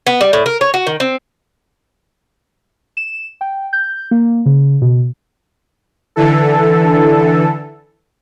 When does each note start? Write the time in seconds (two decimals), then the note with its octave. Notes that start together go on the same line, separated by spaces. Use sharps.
0.07 B3
0.21 G3
0.33 A2
0.46 A#4
0.61 C#5
0.74 F#4
0.87 D#3
1.00 C4
2.97 E7
3.41 G5
3.73 G6
4.11 A#3
4.46 C#3
4.82 B2
6.16 D3 E3 A4